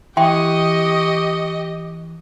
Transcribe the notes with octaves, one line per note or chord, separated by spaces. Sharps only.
E3 G4 D#5 E5 G5 C6 C#6 D#6